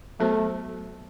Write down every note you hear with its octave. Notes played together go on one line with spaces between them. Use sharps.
F#3 A3 B3 F#4 A4 C5